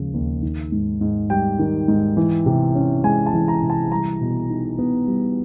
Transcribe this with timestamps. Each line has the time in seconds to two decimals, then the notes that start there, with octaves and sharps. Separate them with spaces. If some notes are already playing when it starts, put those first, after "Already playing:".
Already playing: D#2 C#3 F3 G#3
0.14 D#2
0.43 D#3
0.72 G#2
1.01 G#2
1.30 G3 G5
1.59 D#3
1.88 G#2
2.17 E3
2.46 C3
2.75 C#4
3.04 G#3 G#5
3.26 A5
3.34 E3
3.48 A#5
3.63 C3
3.70 A5
3.91 G3 A#5
4.21 B2
4.50 D#4
4.78 B3
5.07 G3